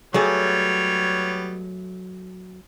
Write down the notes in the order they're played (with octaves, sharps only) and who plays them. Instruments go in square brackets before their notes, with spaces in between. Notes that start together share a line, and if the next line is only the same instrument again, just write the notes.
[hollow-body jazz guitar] F#3 A3 G#4 [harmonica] G3 B3 C#5